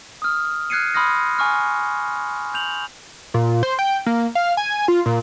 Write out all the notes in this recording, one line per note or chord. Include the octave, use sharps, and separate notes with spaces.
D#6 F6
F6 F#6 G#6 C7 C#7 D#7
B5 C6 D#6 F6 A#6
G#5 C#6 F6
G6 F7 F#7
A#2
C5
G5
A#3
F5
G#5
F4
A#2